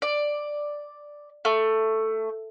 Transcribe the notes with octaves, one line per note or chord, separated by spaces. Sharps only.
D5
A3